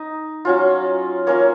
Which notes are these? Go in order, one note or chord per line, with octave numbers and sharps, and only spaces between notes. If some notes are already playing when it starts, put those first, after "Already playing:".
Already playing: D#4
F#3 C#4 F4
A#3 C#4 F4 C#5